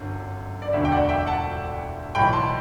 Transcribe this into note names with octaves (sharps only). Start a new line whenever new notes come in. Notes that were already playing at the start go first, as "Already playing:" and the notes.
Already playing: G1 F#2 D3
D5
E1 D2 D3 E5
G5
D5 F#5
E5 G5
F#5 A5
B1 A2 E3 G5 B5
A5 C6